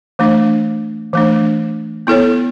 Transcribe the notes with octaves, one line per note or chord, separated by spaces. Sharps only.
E3 A3 D4
E3 A3 D4
B3 E4 A4 C#5